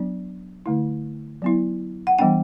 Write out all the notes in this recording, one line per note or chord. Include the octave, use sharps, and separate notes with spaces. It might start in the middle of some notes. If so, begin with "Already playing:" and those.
Already playing: F#3 B3 D4
D3 A3 E4
F#3 B3 E4
F#5
E3 G3 B3 D4 G5